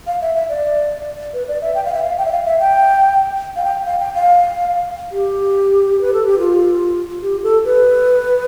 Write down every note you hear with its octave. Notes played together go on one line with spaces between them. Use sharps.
F5
E5
E5
D5
B4
D5
E5
G5
F5
E5
F5
G5
E5
F5
E5
G5
F5
G5
F5
G5
F5
G4
B4
A4
G4
F4
G4
A4
B4